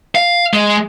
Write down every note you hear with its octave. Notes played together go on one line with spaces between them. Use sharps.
F5
G#3